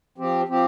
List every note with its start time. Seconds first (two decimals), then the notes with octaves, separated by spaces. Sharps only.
0.18 F3 C4 G4
0.48 F3 C4 G4